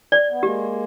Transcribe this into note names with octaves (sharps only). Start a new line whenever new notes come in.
D5
B3
G#3 A#3 G4